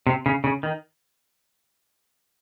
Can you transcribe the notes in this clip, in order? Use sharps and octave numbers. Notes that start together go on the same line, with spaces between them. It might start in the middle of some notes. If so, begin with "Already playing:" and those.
C3
C#3
C#3
D#3